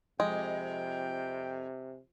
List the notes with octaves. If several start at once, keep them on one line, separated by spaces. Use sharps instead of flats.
F2 C3 G#3 G5